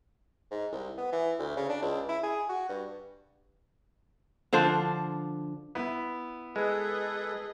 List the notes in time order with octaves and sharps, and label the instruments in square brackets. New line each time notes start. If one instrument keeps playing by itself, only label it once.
[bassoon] G#2
C2
B3
E3
D2
C#3
D4
C#2
E4
G#4
F#4
G2
[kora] D3 F3 D4 C5
[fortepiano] B3 E4
[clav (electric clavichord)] G#3 [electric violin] G#4 D#5 [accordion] A4 B4